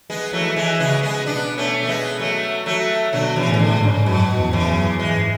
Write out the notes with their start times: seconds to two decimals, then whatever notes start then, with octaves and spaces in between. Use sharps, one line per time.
0.10 G#3 B3
0.33 E3 F#3 A3
0.56 E3 G#3
0.79 C#3 G#3 B3
1.03 G#3 B3
1.26 B2 B3 D4
1.57 A3 C#4
1.83 A3
1.88 G#3 B3
2.19 F#3 A3
2.66 F#3 A3
3.13 B2 D3 F#3
3.36 C#3 E3
3.44 A2
3.54 E3
3.59 D3
3.75 G#2
3.83 C#3
4.06 F#2 B2
4.37 E2
4.53 C#3 E3
4.68 F#2
4.99 G#2 E3 G#3